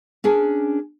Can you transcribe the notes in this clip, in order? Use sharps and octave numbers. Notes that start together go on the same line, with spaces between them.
C#4 D4 G#4 A#4